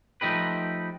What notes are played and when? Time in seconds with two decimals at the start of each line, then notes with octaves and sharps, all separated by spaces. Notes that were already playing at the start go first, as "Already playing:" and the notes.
0.21 F3 A3 D#4 G4 B4